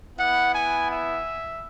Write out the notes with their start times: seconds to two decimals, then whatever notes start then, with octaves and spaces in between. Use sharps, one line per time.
0.18 B3 E4 F#5
0.53 G#5
0.90 E5